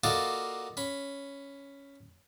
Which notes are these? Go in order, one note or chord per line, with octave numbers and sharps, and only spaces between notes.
A#3 F4 F#4 A4 D5 D#5
C#4 B5